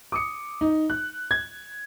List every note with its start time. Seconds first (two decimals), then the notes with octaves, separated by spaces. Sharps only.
0.12 D6 D#6 C#7
0.61 D#4
0.90 F#6
1.31 G#6